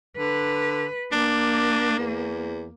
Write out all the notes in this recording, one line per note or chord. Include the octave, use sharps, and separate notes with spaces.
D3 B4
A#3 D4
E2